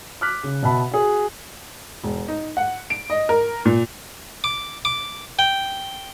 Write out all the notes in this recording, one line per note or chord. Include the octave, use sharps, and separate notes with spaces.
D6 F6 F#6 B6
C#3
B2 E5 A5 B5
F#4 G#4
E1
D#4
F#5
D7
D#5
A#4
A#2
D6
D6
G5